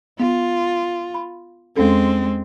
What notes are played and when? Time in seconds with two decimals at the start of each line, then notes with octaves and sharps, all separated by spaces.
0.20 B3 F4
1.14 B5
1.76 E2 G#3 C4 C#4 A4